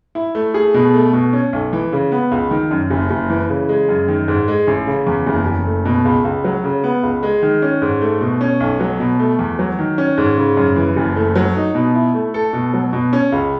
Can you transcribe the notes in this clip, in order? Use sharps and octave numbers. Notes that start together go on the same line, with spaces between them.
E4
A3
G#4
B2
A3
B2
C#4
B1
E3
C#3
B3
C#2
D#3
F#2
F#1
F#1
E3
C#3
G#3
F#2
D#3
G#2
G#3
A1
C#3
E2
F#1
F#1
A3
B2
C#2
C#2
F#3
C#3
B3
C#2
G#3
D#3
C#4
G#2
A3
B2
C#4
B1
F#3
B2
A3
E2
F#3
D#3
C#4
G#2
C#3
F#2
E3
F#1
A3
F#3
D#4
B2
E4
A3
A4
B2
F#3
B2
C#4
C#2